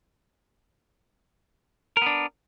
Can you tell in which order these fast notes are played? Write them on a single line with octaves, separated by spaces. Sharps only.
A#4 B3 D4